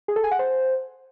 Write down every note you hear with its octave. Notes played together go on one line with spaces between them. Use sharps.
G#4
A4
G#5
F#5
C5